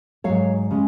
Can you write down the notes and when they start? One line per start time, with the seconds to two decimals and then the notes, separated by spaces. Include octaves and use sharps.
0.24 G#2 F#3 C#5 F5
0.71 C#3 G#3